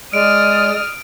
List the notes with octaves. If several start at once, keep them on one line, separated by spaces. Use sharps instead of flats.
G#3 D5 D#6 F6 D7